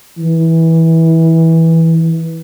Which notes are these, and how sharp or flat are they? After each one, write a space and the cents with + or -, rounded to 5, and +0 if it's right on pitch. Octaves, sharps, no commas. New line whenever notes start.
E3 -15